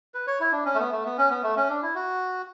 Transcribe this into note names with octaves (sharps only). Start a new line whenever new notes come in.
B4
C#5
E4
D4
C#4
A3
B3
A3
B3
C#4
B3
A3
C#4
D4
E4
F#4